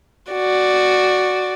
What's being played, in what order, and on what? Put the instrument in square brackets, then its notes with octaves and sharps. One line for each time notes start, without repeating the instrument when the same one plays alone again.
[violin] F#4 D5